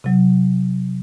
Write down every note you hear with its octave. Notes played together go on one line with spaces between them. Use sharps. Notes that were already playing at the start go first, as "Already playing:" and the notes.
C3 F#3